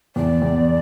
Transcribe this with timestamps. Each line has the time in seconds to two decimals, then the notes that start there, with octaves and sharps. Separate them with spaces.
0.16 E2 D5
0.42 E2